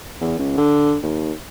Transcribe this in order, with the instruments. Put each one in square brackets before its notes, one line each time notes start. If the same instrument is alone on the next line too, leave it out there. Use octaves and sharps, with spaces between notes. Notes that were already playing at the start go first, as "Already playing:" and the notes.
[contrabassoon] E2
C#2
D3
D#2